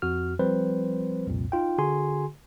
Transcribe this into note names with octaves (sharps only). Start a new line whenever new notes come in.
F2 F#4 F6
F3 G3 C4 B4 C5
C2 F2 A#2
D#4 F4 G5
D3 F#4 G#4 G#5 C6